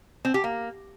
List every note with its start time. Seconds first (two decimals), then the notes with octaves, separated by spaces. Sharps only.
0.25 C4
0.34 G4
0.44 A#3